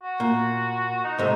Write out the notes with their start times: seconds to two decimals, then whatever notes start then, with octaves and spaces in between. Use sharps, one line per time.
0.03 F#4
0.20 A#2
1.04 D#4
1.18 G#2 C3 A3